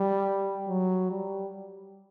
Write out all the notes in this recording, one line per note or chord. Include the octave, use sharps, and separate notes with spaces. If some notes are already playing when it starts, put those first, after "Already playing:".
Already playing: G3
F#3
G3